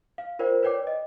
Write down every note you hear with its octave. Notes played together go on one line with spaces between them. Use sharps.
F5
F4 A#4 C5 D5 G5
B4 C#5 D5 G5 D6
D#5